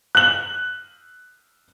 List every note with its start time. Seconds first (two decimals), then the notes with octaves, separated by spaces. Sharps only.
0.15 F#6 F#7